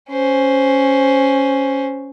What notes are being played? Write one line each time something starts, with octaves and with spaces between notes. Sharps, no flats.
C#4 C5